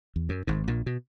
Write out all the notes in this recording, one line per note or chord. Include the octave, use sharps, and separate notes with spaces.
E2
F#2
G#1 G#2
A#1 A#2
B2